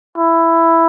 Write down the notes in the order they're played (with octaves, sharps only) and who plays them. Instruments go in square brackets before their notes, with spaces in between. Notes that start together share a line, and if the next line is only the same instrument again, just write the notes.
[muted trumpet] E4